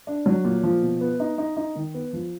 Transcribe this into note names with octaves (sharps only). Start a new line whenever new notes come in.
D4
F#3
A#2
F3
B2
B3
D#4
D#4
D#4
D#3
B3
F3